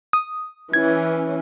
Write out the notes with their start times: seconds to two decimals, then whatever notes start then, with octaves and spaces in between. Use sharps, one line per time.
0.13 D#6
0.73 E3 C#4 G#6